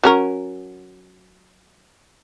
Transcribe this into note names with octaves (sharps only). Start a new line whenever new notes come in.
F#3 C#4 A#4